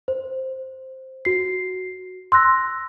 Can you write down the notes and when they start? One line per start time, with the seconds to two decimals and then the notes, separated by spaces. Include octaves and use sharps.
0.08 C5
1.25 F#4 C7
2.32 C6 E6 F#6 A#6